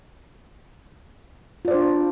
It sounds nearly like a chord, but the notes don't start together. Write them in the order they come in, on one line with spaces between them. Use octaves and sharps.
F4 D5 C5 D4